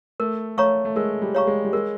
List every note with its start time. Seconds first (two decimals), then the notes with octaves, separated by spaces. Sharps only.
0.20 A3 A#4
0.57 A3 C#5 F5 A#5 C#6
0.85 A3
0.96 G#3 A#4
1.22 G3
1.35 C#5 F5 A#5 C#6
1.47 G#3
1.64 G3
1.73 G#3 A#4